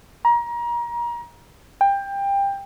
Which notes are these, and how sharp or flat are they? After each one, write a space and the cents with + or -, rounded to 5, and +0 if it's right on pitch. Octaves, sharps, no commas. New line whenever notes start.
A#5 +30
G5 +20